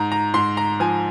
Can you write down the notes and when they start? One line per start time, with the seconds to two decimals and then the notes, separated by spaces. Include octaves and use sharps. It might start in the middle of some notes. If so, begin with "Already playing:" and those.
Already playing: G#2 A#5
0.12 A#5
0.34 G#2 C6
0.57 A#5
0.80 F3 G#5